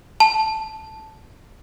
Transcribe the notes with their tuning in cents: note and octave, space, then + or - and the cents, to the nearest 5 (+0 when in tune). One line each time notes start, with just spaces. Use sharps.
A5 -5